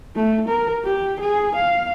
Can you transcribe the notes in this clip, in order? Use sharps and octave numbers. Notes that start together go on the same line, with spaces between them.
A3
A#4
G4
G#4
F5